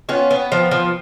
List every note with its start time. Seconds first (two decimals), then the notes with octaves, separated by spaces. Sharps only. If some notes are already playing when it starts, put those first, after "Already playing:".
0.09 B3 C#4 F4
0.31 B3
0.52 F3
0.71 F3